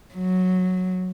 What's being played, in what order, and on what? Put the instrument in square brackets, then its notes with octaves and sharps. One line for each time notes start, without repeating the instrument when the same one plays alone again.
[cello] F#3